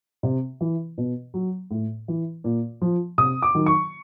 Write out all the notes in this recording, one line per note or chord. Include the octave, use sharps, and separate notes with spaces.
C3
E3
B2
F#3
A2
E3
A#2
F3
C3 D#6
D6
D#3 F#3
C#6